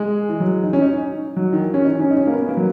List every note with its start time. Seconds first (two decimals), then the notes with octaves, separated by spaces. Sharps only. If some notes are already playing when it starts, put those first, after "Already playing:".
Already playing: G#3
0.29 E3
0.40 F#3
0.64 D#4
0.73 C#4
0.82 D#4
1.36 F#3
1.53 D#3
1.60 E3
1.74 C#4
1.84 D#4
2.00 C#4
2.11 D#4
2.17 C#4
2.27 A#3
2.32 B3
2.49 A#3
2.57 F#3